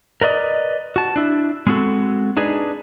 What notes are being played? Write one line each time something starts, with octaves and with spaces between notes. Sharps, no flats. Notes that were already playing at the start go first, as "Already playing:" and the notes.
A#4 B4 D5 D#5
F#4 A5
D4 E4
G#3 B3 C4 F#4 A4
D4 D#4 G#4 B4